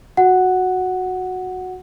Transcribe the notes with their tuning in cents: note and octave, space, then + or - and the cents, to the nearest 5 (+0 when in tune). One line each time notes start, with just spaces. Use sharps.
F#4 -10 F#5 +0